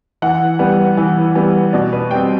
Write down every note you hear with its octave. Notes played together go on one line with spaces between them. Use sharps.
E3 F#5
G3 B3
E3
G3 B3
B2 D5
B4
G3 C4 G5